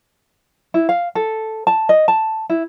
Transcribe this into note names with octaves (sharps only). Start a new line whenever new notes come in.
E4
F5
A4
A5
D#5
A5
E4